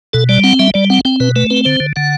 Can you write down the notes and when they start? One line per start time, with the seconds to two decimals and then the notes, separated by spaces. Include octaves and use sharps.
0.13 B2 A4
0.29 G3 D5
0.44 C4 F#5
0.59 G3 E5
0.74 G3 D5
0.90 C4 F#5
1.05 C4 G5
1.20 B2 B4
1.36 A3 B4
1.50 C4 B4
1.65 D3 C5
1.80 D3
1.96 D3 F#5